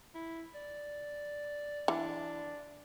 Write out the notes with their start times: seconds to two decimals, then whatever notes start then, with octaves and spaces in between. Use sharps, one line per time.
0.15 E4
0.55 D5
1.88 E3 D4